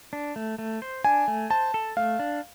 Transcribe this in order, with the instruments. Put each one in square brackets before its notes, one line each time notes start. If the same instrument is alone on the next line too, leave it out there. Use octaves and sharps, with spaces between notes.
[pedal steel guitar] D4
A3
A3
C5
[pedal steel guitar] D4 [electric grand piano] G#5
[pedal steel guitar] A3
[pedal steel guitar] C5 [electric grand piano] A5
[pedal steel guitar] A4
[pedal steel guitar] A3 [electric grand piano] F5
[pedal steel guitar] D4